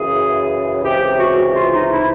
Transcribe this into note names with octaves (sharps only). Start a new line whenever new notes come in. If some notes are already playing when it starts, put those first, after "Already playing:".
Already playing: F#2 C#3 E3 G#4
C#2 C3 E3 G4
F#4
F4
D#4
E4